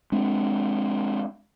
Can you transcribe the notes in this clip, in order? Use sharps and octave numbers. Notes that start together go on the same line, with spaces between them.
G#3 C4 D4